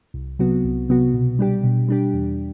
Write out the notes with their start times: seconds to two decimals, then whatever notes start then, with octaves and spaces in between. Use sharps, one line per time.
0.14 C2
0.39 C3 F#3 B3 F#4
0.64 C2
0.89 C3 F#3 B3 F#4
1.14 B2
1.39 G3 D4 G4
1.64 B2
1.88 G3 D4 G4
2.13 E2